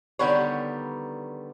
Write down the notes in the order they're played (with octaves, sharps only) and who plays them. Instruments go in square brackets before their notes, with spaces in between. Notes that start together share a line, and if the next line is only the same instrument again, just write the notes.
[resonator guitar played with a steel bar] D3 D#3 G3 B3 B4 C#5